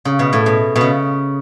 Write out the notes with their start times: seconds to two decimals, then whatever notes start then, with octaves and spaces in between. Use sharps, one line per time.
0.05 C#3
0.19 B2
0.33 A2
0.46 B2
0.76 B2
0.81 C#3